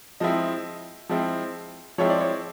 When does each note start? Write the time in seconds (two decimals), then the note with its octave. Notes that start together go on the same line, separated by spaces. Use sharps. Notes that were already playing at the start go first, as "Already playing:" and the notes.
0.20 F3 G#3 C4 E4 D#5
1.09 F3 G#3 C4 E4
1.98 F3 G#3 C4 E4 C#5
2.10 D5
2.21 C#5